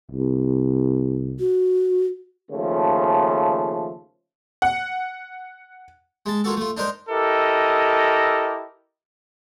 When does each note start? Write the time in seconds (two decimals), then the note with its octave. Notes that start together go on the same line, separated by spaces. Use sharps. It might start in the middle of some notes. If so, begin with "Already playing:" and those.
0.11 C2
1.39 F#4
2.50 D#2 C#3 F3 A3
4.62 F#5
6.26 G#3 A5
6.44 A#3 F4 F#4 A4
6.57 A3 F4
6.77 D4 D#4 A#4 C5
7.10 E4 G4 A4 A#4 D#5